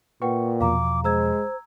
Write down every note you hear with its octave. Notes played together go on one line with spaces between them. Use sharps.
A#2 B4 F#5 G5 C#6
E2 B2 F3 F5 A#5 D6
G#3 C5 A#5 E6 G#6